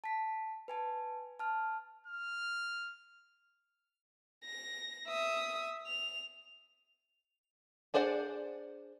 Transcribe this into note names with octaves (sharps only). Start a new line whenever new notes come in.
A5 B6
B4 G#5 A5
A5 F6
F6
A#6
E5 D#6
F7
D4 G#4 C5 D5 F#5